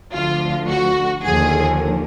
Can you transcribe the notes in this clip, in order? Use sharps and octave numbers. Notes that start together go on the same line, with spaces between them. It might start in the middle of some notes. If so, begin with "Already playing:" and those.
D2 D3 F3 F4
F#4
D#2 D3 F3 G#4